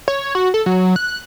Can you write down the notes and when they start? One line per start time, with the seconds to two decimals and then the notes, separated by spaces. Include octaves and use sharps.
0.08 C#5
0.35 F#4
0.54 A4
0.66 F#3
0.96 F#6